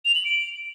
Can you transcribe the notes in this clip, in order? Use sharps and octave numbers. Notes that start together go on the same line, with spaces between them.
F7
F#7
D7